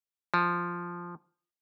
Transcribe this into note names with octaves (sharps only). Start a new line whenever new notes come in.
F3